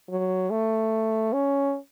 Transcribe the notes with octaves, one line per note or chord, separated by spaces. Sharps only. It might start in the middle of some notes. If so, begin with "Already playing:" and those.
F#3
A3
C#4